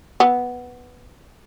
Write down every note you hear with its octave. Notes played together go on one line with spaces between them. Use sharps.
B3